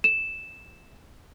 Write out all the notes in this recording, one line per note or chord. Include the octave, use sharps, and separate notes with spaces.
E7